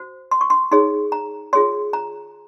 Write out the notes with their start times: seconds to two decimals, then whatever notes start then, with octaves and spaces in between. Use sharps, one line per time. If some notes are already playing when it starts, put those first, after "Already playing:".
Already playing: F#4 C5
0.31 C6
0.41 C#6
0.50 C6
0.71 D#4 G#4 C#5 C6
1.12 A#5
1.53 F4 G#4 C#5 C6
1.93 A#5